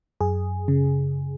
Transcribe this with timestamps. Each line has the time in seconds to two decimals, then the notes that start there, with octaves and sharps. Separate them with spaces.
0.21 F#2 G#4
0.68 C#3